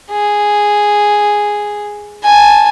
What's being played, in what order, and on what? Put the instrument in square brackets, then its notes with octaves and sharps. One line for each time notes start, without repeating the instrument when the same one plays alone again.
[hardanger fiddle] G#4
G#5 A5